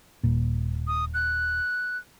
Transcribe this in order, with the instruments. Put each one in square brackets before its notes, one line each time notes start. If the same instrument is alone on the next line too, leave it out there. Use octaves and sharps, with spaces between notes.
[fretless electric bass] D#1 A#2
[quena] D#6
F#6